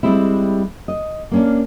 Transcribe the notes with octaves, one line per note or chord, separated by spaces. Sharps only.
G3 G#3 C4 E4
D#5
A#3 C#4 D4